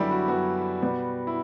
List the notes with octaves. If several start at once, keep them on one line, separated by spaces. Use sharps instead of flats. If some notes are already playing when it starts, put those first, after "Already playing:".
Already playing: F#2 D3 F#3 G3 B3 E4 G4
F#4
F#2 D3 F#3 B3 F#4
B2 G3 B3
E4